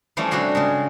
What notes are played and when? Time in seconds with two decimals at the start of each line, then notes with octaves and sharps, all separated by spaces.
0.17 E3 F3 G3 A3 C#4
0.31 C3 G3 D4 F#4 C6
0.55 C#3 G#3